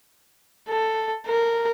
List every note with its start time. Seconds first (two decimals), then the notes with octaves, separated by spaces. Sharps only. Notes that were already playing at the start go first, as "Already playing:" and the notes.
0.69 A4
1.27 A#4